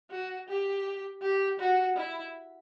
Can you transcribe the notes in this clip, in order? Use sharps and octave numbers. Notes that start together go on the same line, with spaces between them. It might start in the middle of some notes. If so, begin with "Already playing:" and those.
F#4
G4
G4
F#4
E4